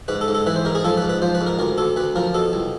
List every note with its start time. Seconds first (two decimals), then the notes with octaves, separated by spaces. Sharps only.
0.08 G#2 B4
0.21 A4
0.28 G#2
0.35 A4
0.46 E3 B4
0.56 C5
0.65 G#2 A#4
0.75 G#4
0.84 F3 A4
0.97 B4
1.02 G#2
1.09 B4
1.22 F3 C5
1.35 B4
1.41 G#2
1.46 A#4
1.59 D2 A#4
1.78 D2 A4
1.96 D2 B4
2.16 F3 A#4
2.34 B2 A4
2.53 C2